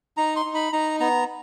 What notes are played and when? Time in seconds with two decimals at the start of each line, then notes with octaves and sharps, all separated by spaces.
0.17 D#4 A#5
0.36 C6
0.45 D#4
0.54 B5
0.73 D#4 A#5
1.00 B3 A#5